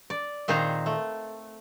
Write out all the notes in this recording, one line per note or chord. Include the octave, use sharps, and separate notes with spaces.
D5
A#2 D#3 C4 G#4 C5 A#5
A3